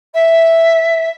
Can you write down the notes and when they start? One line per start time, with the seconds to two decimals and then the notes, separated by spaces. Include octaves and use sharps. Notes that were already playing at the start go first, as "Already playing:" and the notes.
0.14 E5